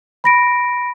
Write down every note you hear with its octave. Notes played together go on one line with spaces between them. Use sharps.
B5 A#6 D7